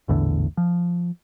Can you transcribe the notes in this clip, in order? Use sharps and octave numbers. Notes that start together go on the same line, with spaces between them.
A#1 E2 A2 D3
F3